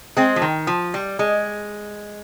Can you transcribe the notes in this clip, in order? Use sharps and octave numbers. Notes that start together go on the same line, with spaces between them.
G#3 C4
F3
D#3
F3
G3
G#3